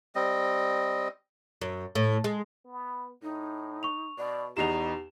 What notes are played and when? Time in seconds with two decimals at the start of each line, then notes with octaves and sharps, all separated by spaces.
0.15 G3 C4 D#5
1.62 F#2
1.95 A2
2.24 G#3
2.66 B3
3.22 A2 D#4
3.83 C#6 F7
4.18 B2 D5
4.57 E2 B2 D#4 G4 A#5 C7 E7 F7